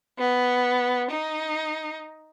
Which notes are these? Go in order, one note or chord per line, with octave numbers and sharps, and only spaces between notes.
B3
D#4